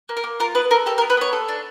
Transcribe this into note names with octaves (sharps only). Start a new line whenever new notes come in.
A#3
A#4
A#3
F4 A#4
B3 B4
A4 A#4
G4 A4
A#4
B3
B4
B3 C#5
A4
D4